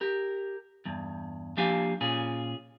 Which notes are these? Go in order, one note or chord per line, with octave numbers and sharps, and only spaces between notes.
G4 A#4
E2 G2
F3 A#3 D4 G4 F5 G#5
A#2 C#4 F4 G#4